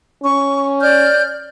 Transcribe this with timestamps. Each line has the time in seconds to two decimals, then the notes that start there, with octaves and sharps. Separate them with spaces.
0.23 C#4 C#6
0.81 D5 F6 G6